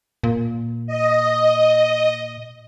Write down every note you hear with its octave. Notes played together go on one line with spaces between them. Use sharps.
A#2
D#5